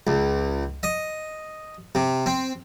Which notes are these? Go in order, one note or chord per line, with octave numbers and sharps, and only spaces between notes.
C#2
D#5
C3
C4